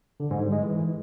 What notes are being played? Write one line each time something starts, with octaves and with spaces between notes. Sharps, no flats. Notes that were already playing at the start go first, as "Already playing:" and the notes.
D3
G#2
G3
G#3
E3